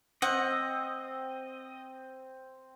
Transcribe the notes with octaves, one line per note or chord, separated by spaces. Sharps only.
C4 D#5 F#5